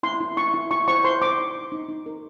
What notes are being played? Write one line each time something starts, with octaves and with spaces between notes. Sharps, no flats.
E4 C6
E4
E4 C#6
E4
E4 C#6
C5 C#6
C5 C6
C5 D6
D#4
D#4
D#4
D#4
A#4